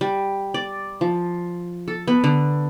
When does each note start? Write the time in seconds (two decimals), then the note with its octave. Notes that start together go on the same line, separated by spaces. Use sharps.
0.01 G3
0.54 D5
1.01 F3
1.88 A4
2.08 B3
2.24 D3